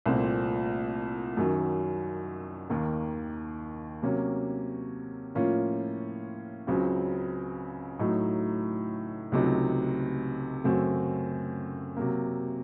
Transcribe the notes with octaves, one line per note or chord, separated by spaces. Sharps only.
C2 A#2 A3 C4
F#2 D#3 F#3
D#2 D#3 A#3
C3 F#3 A#3 C#4
A2 F3 A#3 C#4 F4
C#2 C#3 F#3 C4
A2 F#3 A3 D#4
C#2 C3 F#3 A3 D#4
F#2 C#3 A3 C4 F#4
C3 F#3 A#3